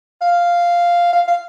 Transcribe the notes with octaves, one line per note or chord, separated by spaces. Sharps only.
F5
F5
F5